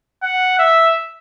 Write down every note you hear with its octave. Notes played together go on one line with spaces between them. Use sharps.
F#5
E5